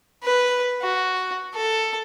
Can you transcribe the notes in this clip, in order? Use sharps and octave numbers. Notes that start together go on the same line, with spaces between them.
B4
F#4
A4